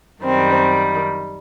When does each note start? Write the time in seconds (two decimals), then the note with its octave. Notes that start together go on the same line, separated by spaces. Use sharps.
0.23 F#2 D#3 G3 C4